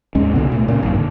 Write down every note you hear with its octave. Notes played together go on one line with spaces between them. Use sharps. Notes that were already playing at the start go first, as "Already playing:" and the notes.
D#2 G#2 G#3 C#4
C2 B2 D3 B3
A#2 A3
A#2 C#3
G#1 F#2 A#2
D3